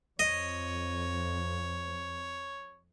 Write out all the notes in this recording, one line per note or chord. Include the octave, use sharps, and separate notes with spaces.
F2 C#5 D#5